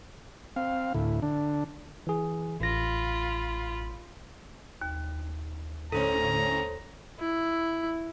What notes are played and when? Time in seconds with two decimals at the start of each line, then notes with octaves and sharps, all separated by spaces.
0.56 C4 F5
0.94 D2 A2 E4
1.22 D3 D4
2.07 E3 G#4
2.60 A1 F4 B5 A#6
4.82 D#2
5.92 A2 D3 C#4 A4 C5 C#5 A#5
7.19 E4